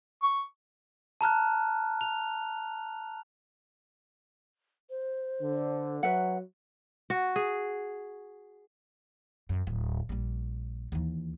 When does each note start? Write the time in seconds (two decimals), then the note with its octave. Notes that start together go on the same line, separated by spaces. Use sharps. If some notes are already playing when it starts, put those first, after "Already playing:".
0.23 C#6
1.21 A5 A#5 F6 F#6
2.01 F7
4.90 C5
5.41 D3
6.03 F#3 B4 E5 F#5
7.10 F#4
7.36 G#4
9.49 F#2
9.67 D1 F#3
10.09 A#1 G3
10.92 D#2 E3